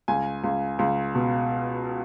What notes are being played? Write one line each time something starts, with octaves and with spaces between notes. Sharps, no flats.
C#2 G#5
C#2
C#2
B2